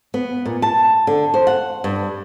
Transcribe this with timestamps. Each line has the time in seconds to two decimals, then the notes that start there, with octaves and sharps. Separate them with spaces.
0.14 B3
0.45 A#2
0.62 A5
1.07 D3
1.34 C5
1.47 F#5
1.84 G2